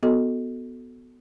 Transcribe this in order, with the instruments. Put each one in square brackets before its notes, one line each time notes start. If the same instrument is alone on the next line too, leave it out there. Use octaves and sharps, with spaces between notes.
[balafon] B3 F#4 A4 D#5